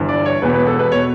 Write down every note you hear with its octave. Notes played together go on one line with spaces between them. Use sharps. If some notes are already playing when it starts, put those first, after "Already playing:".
Already playing: G1 G2 E3
D5
C#5
E1 E2 B2 B4
B4
A4
B4
B2 C#5